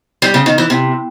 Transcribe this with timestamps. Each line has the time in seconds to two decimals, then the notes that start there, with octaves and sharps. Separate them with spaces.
0.22 G3
0.34 C#3
0.46 D#3
0.58 E3
0.70 C3